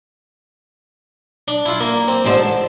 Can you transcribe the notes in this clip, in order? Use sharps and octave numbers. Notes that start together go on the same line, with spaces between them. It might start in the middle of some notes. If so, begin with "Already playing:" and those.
D4
E4 F4
A#3
C4
A1 G#2 D3 C5 A5
A5